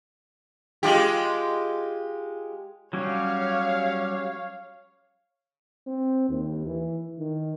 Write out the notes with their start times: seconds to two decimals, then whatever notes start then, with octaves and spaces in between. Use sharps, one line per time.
0.83 G#3 F4 G4
2.93 F#3 G3 C#4 C#5 F5
5.87 C4
6.29 D#2
6.66 E3
7.19 D#3